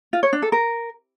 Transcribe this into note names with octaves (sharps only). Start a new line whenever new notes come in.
F4
C#5
D4
A4
A#4